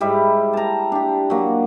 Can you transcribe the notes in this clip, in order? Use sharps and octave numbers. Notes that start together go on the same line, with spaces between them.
G#2 G3 E4
A5 A#5
D4 G4
F#3 A#3